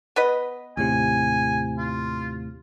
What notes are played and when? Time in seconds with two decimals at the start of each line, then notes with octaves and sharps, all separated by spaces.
0.16 B3 B4 D#5
0.77 D#2 A2 C3 G#5
1.77 F4